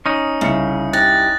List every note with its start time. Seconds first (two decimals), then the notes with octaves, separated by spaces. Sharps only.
0.06 C#4 D#4 D#6
0.41 C2 C#3 C#7
0.93 G4 F#6 A6 A#6